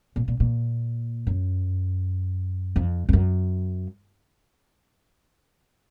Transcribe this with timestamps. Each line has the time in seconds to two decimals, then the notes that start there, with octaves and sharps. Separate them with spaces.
0.16 A#2
0.28 A#2
0.40 A#2
1.27 F#2
2.76 F2
3.09 F2
3.13 F#2